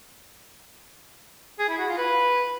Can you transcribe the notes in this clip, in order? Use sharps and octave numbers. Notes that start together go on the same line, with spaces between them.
G#4
E4
F#4
F4
B4